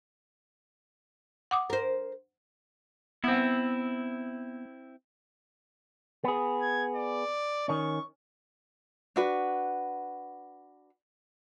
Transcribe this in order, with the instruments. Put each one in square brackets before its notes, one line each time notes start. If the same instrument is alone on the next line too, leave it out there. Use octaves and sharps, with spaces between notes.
[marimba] F#5 D6 D#6
[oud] A#4 C5
[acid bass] B3 [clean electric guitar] C4 E4
[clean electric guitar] B3 G#4
[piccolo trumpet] G#6
D5
[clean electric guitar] D#3 C#4 [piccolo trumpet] C#6
[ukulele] D4 F#4 B4